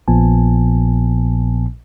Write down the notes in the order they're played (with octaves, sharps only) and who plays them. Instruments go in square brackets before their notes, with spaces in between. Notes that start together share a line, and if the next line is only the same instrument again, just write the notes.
[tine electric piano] A#1 A#2 F3 B3 G#5 A5